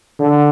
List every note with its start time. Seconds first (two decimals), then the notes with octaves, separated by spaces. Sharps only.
0.19 D3